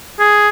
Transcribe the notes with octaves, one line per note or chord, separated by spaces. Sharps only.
G#4